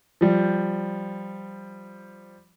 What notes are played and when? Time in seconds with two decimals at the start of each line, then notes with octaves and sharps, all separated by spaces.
0.21 F3 G3